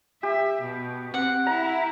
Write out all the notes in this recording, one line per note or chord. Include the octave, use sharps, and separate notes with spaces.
G4 E5
B2
C4 F#5
E4 A#5